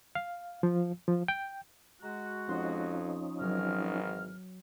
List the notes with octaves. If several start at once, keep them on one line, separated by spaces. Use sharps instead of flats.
F5
F3
F3
G5
G#3 F#4 A#5
F2 F3 C#4 D#4 C6
G#1 E3 F#3 A#4 F6